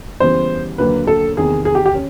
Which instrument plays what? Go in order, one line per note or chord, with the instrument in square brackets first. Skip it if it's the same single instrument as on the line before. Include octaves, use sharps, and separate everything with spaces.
[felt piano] C#3 E3 G3 B3 [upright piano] C5
[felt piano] D#2 D3 F#3 A#3 [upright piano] B4
[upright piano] A4
[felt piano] E2 C3 D#3 [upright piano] G#4
[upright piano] G#4
G4
G4
[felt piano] C#4